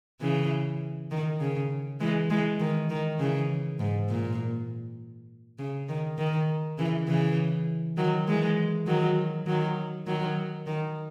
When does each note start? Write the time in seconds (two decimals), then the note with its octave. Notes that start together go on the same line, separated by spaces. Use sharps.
0.21 C#3 E3
1.11 D#3
1.40 C#3
2.00 E3 G#3
2.30 E3 G#3
2.60 D#3
2.90 D#3
3.20 C#3 E3
3.79 G#2
4.09 A#2
5.59 C#3
5.89 D#3
6.18 D#3
6.78 C#3 E3
7.08 C#3 E3
7.97 D#3 F#3
8.28 E3 G#3
8.87 D#3 F#3
9.47 D#3 F#3
10.06 D#3 F#3
10.67 D#3